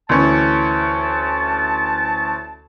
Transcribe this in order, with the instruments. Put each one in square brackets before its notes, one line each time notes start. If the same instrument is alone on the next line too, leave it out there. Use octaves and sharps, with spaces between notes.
[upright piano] D2 E3 C#4 [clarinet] A5